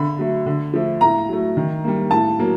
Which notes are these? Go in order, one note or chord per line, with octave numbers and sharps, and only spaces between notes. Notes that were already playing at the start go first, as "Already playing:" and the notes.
Already playing: D3 B5
F#3 A3
D3
F3 A3
A2 A#5
F#3 A3
D#3
G3 A#3
A2 A5
F#3 A#3